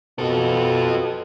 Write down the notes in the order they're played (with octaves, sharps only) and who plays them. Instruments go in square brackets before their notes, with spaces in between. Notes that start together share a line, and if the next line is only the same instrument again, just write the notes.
[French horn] B2 [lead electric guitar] F4 A4